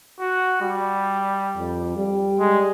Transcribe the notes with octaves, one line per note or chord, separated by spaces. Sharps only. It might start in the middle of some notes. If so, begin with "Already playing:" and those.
F#4
G3
F2
G3
G#3